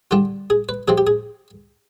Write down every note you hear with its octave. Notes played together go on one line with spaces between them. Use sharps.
D3 G3 D4 F4
G#4
B4
C3 F3 C4 G#4
G4
G#4